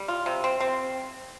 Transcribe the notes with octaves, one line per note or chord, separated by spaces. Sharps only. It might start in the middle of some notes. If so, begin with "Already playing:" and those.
Already playing: G3
F4
C3
C4
C4